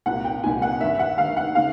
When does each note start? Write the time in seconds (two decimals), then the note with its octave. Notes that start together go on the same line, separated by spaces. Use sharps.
0.06 C2 A#2 F#5
0.25 G5
0.43 C2 A#2 G#5
0.62 F#5
0.81 G2 D#3 E5
0.99 F#5
1.18 G2 D#3 F5
1.37 F#5
1.55 C#3 F5